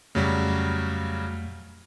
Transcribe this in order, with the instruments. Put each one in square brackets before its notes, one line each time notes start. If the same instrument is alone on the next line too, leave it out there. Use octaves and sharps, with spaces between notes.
[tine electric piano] F2 A3 [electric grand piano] C#3 F#3 G3